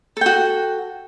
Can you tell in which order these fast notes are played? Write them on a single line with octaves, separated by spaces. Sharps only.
A4 G5 F#4